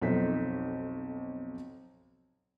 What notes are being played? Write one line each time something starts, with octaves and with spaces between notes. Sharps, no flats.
B1 F2 D#4 A4 C5 B6